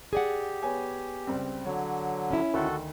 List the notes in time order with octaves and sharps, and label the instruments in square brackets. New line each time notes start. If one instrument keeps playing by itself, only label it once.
[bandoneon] G4 [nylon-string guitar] G#4 D5 F#5
[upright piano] B3 C#5 G#5
C#2 G3 C4
[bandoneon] D3 F#3 [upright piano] C#5
[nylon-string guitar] C#4 E4
[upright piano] D2 D#3 [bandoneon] F#4 A4